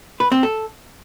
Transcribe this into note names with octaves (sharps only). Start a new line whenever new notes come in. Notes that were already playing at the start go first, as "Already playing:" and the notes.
B4
C4
A4